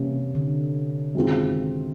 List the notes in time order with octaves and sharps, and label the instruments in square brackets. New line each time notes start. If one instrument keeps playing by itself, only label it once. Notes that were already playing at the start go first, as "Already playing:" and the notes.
Already playing: [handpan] C3 [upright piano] E3 G3 A#3 C#4
[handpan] D3
[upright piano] F#2 D#3 G#3 C4 F4